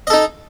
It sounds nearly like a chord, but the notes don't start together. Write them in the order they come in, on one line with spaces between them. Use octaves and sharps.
D#5 A4 D#4